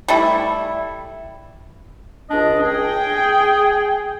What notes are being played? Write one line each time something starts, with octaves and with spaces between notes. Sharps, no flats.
G3 A3 E4
C#2 D4 D#5
G#4 G5